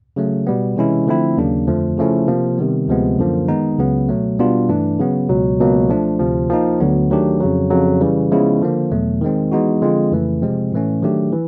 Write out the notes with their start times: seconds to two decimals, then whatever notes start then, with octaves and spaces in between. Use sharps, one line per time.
0.16 C#3 F#3 A3
0.47 B2 G3 B3
0.76 C3 E3 G#3 C#4 E4
1.07 D3 F3 A3 C4 E4
1.37 D#2 C#3 F#3 A#3 D4
1.67 F2 D3 F3 A3
1.98 C#3 F3 A3 C#4 E4
2.28 C3 F3 A#3
2.58 C3 D#3 G3 B3
2.88 D2 C3 F3 G#3 B3
3.19 F#2 D3 F3 A#3
3.48 D#3 G#3 B3 D#4
3.79 C#2 C#3 F#3 B3
4.09 B2 F#3 A3
4.39 B2 G3 B3 D4 F4
4.69 G2 E3 A3 D4
4.99 C#3 F#3 B3
5.29 C#2 B2 F#3
5.60 C#2 B2 F#3 A#3
5.89 F3 A3 D4
6.19 D2 C3 F3
6.50 F3 A#3 D#4
6.80 D2 D3 F#3 B3
7.10 D#3 F#3 A3 D4 G4
7.40 F2 C#3 F#3
7.71 F2 C#3 F#3
8.01 C#3 E3 G3
8.31 C#3 F3 G#3 B3 E4
8.61 D3 F3 A#3
8.91 E2 B2 F#3 A3
9.22 D#3 G#3 C4
9.52 E3 G#3 B3 D#4 F#4
9.82 D3 F3 G#3 C4 F4
10.12 F2 C#3 E3 A3
10.42 C3 F3 G#3 C4
10.72 A2 E3 A3 C#4
11.02 D#3 F#3 A3 D4 G4
11.32 E3